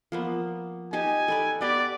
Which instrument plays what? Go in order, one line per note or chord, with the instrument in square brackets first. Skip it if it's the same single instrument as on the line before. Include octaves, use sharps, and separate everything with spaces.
[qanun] F3 A#3 B3
[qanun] D#4 G4 A5 [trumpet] G#5
[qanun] A4 B4 D5
[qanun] B3 G4 B4 [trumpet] D5